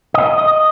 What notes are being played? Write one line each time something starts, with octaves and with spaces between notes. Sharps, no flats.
D#5
D#5